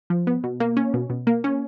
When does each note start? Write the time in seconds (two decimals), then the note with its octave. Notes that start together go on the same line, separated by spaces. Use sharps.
0.10 F3
0.27 B3
0.44 B2
0.60 A#3
0.77 C#4
0.94 B2
1.10 B2
1.27 A#3
1.44 C#4